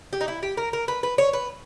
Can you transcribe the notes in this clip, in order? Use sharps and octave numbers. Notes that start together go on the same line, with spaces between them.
G4
D#4
E4
G4
A#4
A#4
B4
B4
C#5
B4